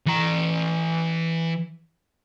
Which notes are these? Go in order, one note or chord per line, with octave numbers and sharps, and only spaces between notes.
E3 A#5